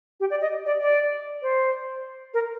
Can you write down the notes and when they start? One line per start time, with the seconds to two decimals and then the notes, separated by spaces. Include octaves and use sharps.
0.20 G4
0.30 D5
0.41 D#5
0.66 D5
0.81 D5
1.42 C5
2.34 A#4